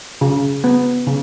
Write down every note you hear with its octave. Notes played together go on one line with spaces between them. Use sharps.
C#3
B3
C#3